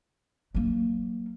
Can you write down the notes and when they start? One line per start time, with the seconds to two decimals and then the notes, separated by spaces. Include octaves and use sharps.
0.55 F#3 A#3